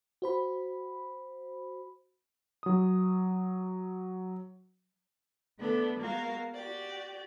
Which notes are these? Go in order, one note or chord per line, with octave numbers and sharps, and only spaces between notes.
F#4 C5 B5
F#3 D#6
D3 A3 B3 D4 A4 B4
G#3 A#3 B3 F#4 A#4 F5
F#4 G4 D5